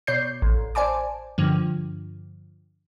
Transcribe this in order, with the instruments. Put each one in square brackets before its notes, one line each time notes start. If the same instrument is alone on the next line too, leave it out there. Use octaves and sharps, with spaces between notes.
[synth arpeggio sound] B2 C#5 D5 G6 C7
A1
C5 D5 G#5 A5 D6
G2 D3 F3